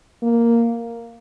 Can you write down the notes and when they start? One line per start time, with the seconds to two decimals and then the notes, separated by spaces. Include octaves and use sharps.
0.23 A#3